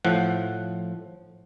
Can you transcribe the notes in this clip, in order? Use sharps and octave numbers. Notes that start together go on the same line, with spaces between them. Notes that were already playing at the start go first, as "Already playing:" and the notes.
A2 F3 F#5